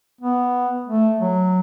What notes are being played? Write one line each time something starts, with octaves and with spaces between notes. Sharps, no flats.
B3
A3
F#3